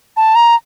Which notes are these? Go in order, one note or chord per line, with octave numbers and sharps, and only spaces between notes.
A5
A#5